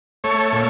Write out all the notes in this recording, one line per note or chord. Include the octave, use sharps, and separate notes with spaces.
A3 C#5
A#2 C#5